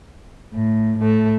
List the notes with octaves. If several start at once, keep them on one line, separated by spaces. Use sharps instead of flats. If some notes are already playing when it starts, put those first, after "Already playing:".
A2
A2 A3